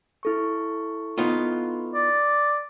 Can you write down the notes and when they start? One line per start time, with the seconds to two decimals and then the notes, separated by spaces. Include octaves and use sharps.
0.23 E4 A4 C#6
1.18 B3 D#4 F4
1.94 D5